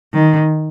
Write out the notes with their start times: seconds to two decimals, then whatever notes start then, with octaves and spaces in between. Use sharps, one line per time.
0.14 D#3